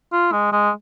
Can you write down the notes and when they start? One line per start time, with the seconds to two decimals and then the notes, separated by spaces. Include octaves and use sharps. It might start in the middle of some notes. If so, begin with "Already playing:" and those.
0.12 F4
0.32 G#3
0.52 G#3